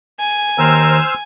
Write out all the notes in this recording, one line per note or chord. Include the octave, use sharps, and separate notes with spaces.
G#5
D#2 A#4 C5 E6 F6